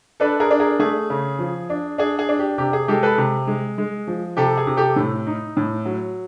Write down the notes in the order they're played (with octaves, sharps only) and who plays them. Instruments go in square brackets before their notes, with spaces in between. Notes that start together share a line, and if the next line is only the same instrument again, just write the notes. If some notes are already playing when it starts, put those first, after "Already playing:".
[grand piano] D4 A4 B4
G#4 A#4
D4
G#4 A#4
A3 G#4
C#3
F3
D4
D4 G#4
G#4
D4
G4
C3 G4
G#4
G#3 G4 A4
A4 B4
C3
G#3
G#3
F3
C3 G4 A4
G#4
C3
G4 A4
A2
D#4
A2
F#3